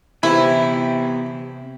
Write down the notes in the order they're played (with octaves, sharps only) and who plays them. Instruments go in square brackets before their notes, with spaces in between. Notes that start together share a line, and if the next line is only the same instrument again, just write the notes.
[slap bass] C3 [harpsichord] E3 [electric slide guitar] B3 G4 [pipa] E4